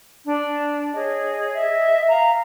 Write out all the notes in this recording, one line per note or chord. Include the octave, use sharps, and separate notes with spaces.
D4
G#4 C#5 D#5
D#5 E5
F5 A#5